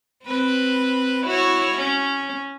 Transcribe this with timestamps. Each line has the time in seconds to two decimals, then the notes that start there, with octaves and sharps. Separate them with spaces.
0.24 C4 B4
1.25 E4 F#4 C#5
1.78 C#4